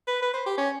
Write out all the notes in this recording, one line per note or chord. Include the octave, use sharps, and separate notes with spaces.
B4
B4
C5
G4
C#4